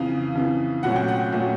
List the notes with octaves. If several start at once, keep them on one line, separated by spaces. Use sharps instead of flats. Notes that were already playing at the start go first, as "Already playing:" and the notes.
Already playing: F2 C#3 E3 F5
F2 C#3 E3
C2 A#2 F#3 A3 C#4 F#5
G5
F#5
A#2 F#3 A3 C#4